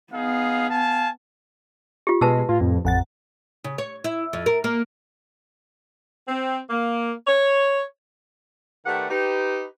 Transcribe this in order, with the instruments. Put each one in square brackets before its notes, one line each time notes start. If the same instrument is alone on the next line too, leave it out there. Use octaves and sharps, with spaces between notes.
[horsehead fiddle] B3 [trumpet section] D#4 G#4 F5
[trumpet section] F5 G#5 A5
[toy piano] F4 G4
[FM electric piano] B2 [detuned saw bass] G#3 [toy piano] B4 A5 E6
[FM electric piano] A2 [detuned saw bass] F4
[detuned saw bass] F2
[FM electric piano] A1 F#5 A6 [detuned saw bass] F2
[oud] C#3
C#5
E4
F2
A#4
A#3
[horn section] C4
A#3
C#5
[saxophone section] D#3 A3 G4 B4 D5 F#5
D#4 G4 B4